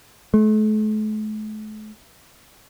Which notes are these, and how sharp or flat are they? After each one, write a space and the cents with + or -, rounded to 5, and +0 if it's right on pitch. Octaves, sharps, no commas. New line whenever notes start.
A3 -40